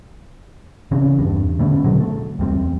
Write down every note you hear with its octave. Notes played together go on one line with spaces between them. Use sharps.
C#3 E3 C4 C#4
E2 G2
D3 A3 B3 C#4
B2 D3 F#3 G#3
A3
E2 G3 C4